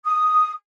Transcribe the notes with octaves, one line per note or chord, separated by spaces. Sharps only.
D#6